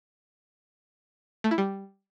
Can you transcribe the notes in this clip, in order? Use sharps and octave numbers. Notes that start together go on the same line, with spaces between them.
A3
E4
G3